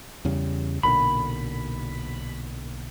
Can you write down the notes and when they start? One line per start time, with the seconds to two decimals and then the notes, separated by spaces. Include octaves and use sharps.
0.25 E2 C#3 G3
0.83 B1 A#2 D3 B5